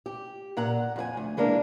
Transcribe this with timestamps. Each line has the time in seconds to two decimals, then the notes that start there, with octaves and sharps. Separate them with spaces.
0.06 G4
0.57 A#2 F#5 A#5
0.96 F2 G4 G#5
1.17 D2
1.37 E3 G#3 A#3 D4 A#4